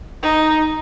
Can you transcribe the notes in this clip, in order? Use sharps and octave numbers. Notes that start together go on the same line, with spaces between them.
D#4